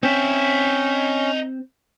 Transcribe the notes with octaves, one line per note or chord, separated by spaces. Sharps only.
C4 C#4 D#4 E5